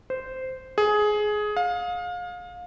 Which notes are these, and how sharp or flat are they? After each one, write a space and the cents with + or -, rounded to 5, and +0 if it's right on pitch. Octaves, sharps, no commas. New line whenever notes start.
C5 -10
G#4 +15
F5 +30